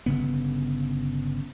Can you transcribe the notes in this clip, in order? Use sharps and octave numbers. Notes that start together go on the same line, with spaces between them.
G1 C#3 B3